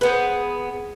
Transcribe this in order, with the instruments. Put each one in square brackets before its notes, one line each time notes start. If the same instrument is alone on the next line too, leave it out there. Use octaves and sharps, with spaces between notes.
[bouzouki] B3 G#4 [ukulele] B4 C5